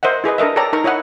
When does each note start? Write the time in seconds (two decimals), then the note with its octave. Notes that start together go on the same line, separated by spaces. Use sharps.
0.03 A#4 C5 D#5 E5 F#5
0.24 E4 G#4 B4 D#5
0.38 D4 A4 A#4 D#5 E5
0.56 A4 C#5 D5 G5 A#5
0.73 D#4 A#4 A#5 C#6
0.84 E4 C#5 D#5 E5 F#5